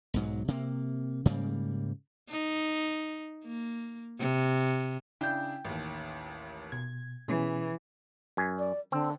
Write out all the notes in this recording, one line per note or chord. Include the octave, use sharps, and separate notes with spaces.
B1 G#2 F#3
C3 A#3
G#2 C#3 G3 A#3
D#4
A#3
C3
C#3 D4 E4 G5 G6
A1 D#2
B2 G#6
B2 E3 C#4 G#4
F#2 G#5
D5
D3 C4